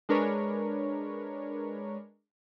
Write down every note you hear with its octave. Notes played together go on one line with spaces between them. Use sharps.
G#3 D4 A#4 B4 C#5